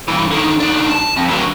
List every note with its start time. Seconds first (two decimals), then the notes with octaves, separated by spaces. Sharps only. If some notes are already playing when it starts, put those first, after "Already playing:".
0.08 G2 E3
0.31 D3 D#3
0.60 D#3 D4
0.90 A5
1.17 F2
1.29 D3 F#3